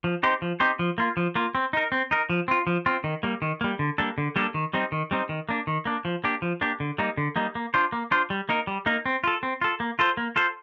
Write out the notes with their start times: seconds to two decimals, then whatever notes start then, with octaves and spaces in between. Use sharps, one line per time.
0.04 F3
0.23 C4 D#4 G4 C5
0.42 F3
0.60 C4 D#4 G4 C5
0.79 F3
0.98 A#3 F4
1.17 F3
1.35 A#3 F4
1.55 C4
1.73 D#4 A#4
1.92 C4
2.11 D#4 A#4
2.30 F3
2.48 C4 F4
2.67 F3
2.86 C4 F4
3.04 D#3
3.23 G3 A#3
3.42 D#3
3.61 G3 A#3
3.79 D3
3.98 G3 A#3 D4 A4
4.18 D3
4.36 G3 A#3 D4 A4
4.54 D#3
4.73 G3 C4 D#4
4.92 D#3
5.11 G3 C4 D#4
5.29 D#3
5.49 A#3 D4
5.67 D#3
5.85 A#3 D4
6.05 F3
6.24 A#3 D4 G4
6.42 F3
6.61 A#3 D4 G4
6.80 D3
6.98 G3 A#3 D#4
7.17 D3
7.36 G3 A#3 D#4
7.55 A#3
7.74 D4 F4 C5
7.92 A#3
8.11 D4 F4 C5
8.30 G3
8.49 A#3 D#4 A#4
8.67 G3
8.86 A#3 D#4 A#4
9.06 C4
9.24 F4 A4
9.43 C4
9.62 F4 A4
9.80 A#3
9.99 F4 A4 C5
10.17 A#3
10.36 F4 A4 C5